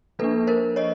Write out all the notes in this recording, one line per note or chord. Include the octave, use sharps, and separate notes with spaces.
F3 A#3 D4 A4 B4
A#4 C5
C#5 D#5